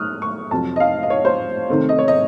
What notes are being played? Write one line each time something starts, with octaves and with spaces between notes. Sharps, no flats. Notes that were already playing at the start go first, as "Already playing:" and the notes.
Already playing: A3 C#6 D#6 F6 F#6
C#6
F2 C3 F#3 A5
D#5
F5
D#5
C#5
C5
C3 D#3 A3 C4
D#5
C#5
D#5